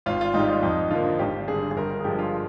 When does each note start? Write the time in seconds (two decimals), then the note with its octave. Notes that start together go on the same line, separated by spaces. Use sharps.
0.06 G#1 F4
0.21 F4
0.34 G#2 G3 D#4
0.48 F4
0.63 F2 D#4
0.91 D3 F3 A#3 F4
1.19 G#1 G4
1.48 G2 D3 G#4
1.71 G#4
1.76 G1 A#4
1.91 A#4
2.00 G#4
2.04 G2 F3 G#3 G4
2.19 F4